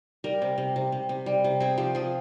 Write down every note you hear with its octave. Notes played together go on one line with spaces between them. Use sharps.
G3 A#4
C3
C3
C3
C3
C3
G3
C3
C4 G#4
F3 G4
F3 G#4